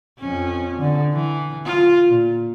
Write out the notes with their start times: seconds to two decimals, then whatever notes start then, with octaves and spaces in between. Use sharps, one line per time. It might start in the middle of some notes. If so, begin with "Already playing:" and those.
0.19 F2 C#4
0.78 D3
1.13 E3
1.65 F4
2.07 A#2